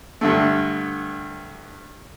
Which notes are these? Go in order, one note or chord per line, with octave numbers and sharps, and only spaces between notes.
G2 D3 A3